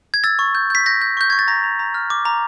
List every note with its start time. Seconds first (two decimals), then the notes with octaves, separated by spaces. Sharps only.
0.14 G#6
0.24 E6 A6
0.39 C#6
0.55 G6
0.70 G6 B6
0.86 G6 A#6
1.01 G6
1.17 C#6 G6
1.30 C#6 G#6
1.39 A6
1.48 A#5 A#6
1.64 A#5
1.79 A#5
1.94 F6
2.10 D6
2.25 A#5